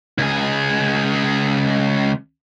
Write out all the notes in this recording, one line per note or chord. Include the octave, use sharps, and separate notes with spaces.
C#2 G#4